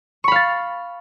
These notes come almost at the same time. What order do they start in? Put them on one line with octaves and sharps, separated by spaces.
C#6 B5 F5 A6